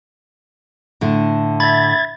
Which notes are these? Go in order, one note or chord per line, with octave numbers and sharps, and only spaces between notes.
A2 D3
E5 B5 G#6 A6